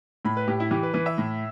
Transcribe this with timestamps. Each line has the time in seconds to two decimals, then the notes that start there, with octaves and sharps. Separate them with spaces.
0.25 A2 B5
0.37 B4
0.47 A2 G4
0.60 E4
0.71 E3 G4
0.83 B4
0.93 E3 B4
1.06 E5
1.18 A2